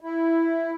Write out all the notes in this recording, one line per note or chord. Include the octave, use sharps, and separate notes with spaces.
E4